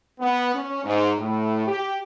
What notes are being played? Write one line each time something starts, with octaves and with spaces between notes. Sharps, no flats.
B3
C#4
G#2
A2
G4